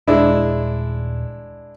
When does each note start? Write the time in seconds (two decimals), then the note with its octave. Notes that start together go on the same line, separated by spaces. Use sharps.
0.07 D#1 G#3 D4 E4